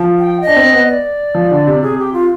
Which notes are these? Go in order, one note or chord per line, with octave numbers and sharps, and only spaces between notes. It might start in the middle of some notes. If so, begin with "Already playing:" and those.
Already playing: F3
G5
D#5
D4
C4
B3
D5
F3
D3
C3
C3 G#4
G4
F4